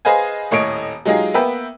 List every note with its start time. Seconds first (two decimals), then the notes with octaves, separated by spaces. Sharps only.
0.05 G#4 B4 C5 D#5 F5 G#5
0.51 D#1 A2 C#5 D#5 D7
1.05 F#3 G#3 D#4 F4 G4 G#4
1.34 A#3 B3 B4 E5 G5